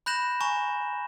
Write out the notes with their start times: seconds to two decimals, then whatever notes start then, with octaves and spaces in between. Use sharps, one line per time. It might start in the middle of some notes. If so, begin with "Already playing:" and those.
0.06 B5 F#6 G6 A#6 E7 F#7
0.40 G#5 A#5 C#6 E7